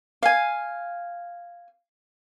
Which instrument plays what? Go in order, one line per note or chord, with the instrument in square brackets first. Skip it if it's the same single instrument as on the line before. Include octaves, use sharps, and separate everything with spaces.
[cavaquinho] F5 G#5